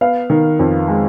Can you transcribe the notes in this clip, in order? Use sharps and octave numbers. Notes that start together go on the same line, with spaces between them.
B3 F5
D#3
F2
G#3